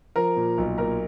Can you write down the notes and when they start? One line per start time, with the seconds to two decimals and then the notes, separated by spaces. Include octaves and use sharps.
0.16 F3 A#4 A#5
0.36 A#2
0.58 B1
0.78 A#2 A#4 A#5